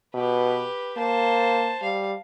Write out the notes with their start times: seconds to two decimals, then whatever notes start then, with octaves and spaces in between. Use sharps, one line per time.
0.15 B2 G4 B4
0.97 A#3 C5 A5
1.82 G3 F5